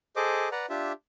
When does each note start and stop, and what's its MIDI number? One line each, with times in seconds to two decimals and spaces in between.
0.16 0.49 68
0.16 0.49 69
0.16 0.49 72
0.16 0.49 75
0.16 0.49 86
0.52 0.66 71
0.52 0.66 74
0.52 0.66 78
0.52 0.66 82
0.70 0.92 62
0.70 0.92 65
0.70 0.92 67
0.70 0.92 76